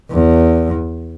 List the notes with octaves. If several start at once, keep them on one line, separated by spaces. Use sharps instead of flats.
E2